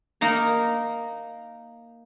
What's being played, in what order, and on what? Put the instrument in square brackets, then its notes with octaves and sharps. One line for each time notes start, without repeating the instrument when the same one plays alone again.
[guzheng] A#3 D#4 A#5